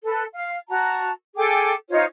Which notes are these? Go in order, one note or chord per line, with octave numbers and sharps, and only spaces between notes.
A4 B4
F5
F#4 A5 A#5
G#4 A4 G5 D6
D#4 F4 C5 C#5